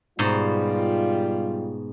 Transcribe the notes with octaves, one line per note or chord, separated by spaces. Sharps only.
G#2 B2 G3 F4